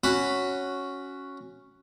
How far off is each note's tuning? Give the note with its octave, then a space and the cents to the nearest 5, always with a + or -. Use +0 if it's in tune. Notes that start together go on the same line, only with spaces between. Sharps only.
C#4 +0 F#4 +0 B5 +0